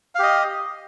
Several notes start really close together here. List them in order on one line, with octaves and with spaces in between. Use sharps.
F5 G4 D#5